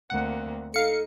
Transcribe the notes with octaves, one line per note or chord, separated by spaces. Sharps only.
D2 A#3 C4 F#5
D#4 A4 F5 C#7